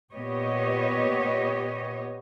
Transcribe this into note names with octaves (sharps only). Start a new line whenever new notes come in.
A#2 B3 G4 C#5 D#5